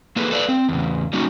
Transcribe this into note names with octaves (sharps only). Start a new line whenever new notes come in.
A#3 F4 G#4 A4 B4
A4 B4 D5 E5 F5
C4
E2 C#3
F#3 G3 A#3 C#4 D#4 F#4